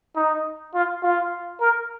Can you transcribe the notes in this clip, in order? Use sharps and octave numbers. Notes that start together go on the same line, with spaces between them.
D#4
F4
F4
A#4